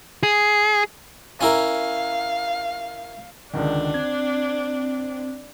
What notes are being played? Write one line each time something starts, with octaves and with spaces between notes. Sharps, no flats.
G#4
C#4 E4 A#4 F5
C#2 D3 D#3 D4
C4 G#6